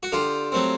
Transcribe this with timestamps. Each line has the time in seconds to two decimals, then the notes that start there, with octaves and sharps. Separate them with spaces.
0.03 F#4
0.12 D3 F4 G4
0.52 F#3 A3 C4